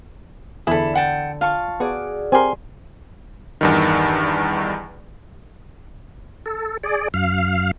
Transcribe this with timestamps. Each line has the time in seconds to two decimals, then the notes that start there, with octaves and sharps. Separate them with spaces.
0.67 E2 D3 E4 G#4 A4 B5
0.95 F#5 G5 A5
1.41 F4 F5 A5 C#6
1.80 B3 F#4 G#4 D5
2.32 C4 G4 A#4 G#5 C6
3.61 E2 G2 D#3
6.46 A4
6.83 G#4 D5
7.14 F#2 F5